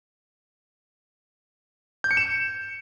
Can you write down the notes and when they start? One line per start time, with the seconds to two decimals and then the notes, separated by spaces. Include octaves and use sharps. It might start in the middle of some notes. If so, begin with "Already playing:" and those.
2.04 G6
2.11 C#7
2.17 E7